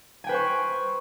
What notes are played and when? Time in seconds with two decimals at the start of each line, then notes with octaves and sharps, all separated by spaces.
0.24 G#5
0.27 G5
0.29 B4
0.32 C5
0.34 C#6